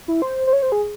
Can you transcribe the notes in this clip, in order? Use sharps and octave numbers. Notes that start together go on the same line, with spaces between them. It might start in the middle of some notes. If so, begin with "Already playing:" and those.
E4
C5
C5
C#5
C5
G#4